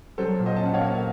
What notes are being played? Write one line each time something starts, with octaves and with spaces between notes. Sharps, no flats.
F#3 A4 C5
A#2
C5 D#5
C#4 A5
F#5
C#5 F5
A#3